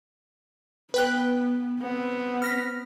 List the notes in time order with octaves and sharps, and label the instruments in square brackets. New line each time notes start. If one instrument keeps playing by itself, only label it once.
[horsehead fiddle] B3 [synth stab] B4 G5 F#6
[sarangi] B3 [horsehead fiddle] C4
[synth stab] F6 A#6 B6